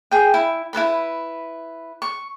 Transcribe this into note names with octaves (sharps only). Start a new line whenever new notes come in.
G#4 G5
E4
E4 A4 B4 B5
C#6